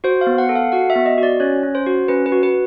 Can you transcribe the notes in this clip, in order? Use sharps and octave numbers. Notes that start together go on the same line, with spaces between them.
F#4 C5
F5
B3
F#5
A4
F5
F#4 F#5
E5
B3
D#5
F#4
D5
C#4 C#5
C#4
C5
F#4
C#4 B4
B4
F#4
B4